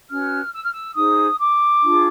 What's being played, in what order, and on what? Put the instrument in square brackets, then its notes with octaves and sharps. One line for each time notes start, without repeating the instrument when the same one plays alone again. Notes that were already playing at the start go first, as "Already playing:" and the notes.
[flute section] C#4 F#4 B4 F6
E6
F6
E6
D#4 G#4 C5 D#6
D6
D4 F4 G#4